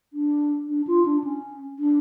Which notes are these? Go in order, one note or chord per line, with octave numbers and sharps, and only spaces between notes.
D4
D4
F4
D4
C#4
D4